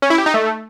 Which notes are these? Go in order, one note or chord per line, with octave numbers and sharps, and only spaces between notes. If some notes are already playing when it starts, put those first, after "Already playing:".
C#4
E4
G4
D#4
A3